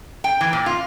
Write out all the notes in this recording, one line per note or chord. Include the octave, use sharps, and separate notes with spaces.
G5
E3
A#2
F4